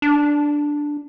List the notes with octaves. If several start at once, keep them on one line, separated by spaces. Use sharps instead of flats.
D4